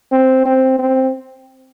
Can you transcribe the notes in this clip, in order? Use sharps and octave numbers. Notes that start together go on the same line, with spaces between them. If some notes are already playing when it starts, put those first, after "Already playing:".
C4
C4
C4